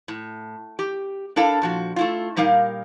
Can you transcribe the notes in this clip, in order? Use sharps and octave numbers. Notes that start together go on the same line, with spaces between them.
A2
G4
D4 E4 A4 A#4 F5
A#2 F3 F#4
A3 E4 F4
A#2 G3 D#4 A#4 F5